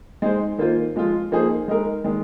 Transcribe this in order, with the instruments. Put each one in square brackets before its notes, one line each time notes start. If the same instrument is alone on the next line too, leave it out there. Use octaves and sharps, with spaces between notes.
[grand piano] G#3 D#4 G#4 C5
D#3 A#3 F4 C5
F3 G#3 F4
F3 A#3 D#4 G#4 C5
G#3 D#4 A#4
D#3 G#3